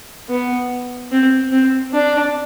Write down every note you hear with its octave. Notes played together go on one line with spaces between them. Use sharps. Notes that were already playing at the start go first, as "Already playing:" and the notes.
B3
C4
C4
D4